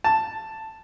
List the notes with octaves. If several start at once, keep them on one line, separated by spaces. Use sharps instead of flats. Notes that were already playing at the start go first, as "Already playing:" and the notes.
A5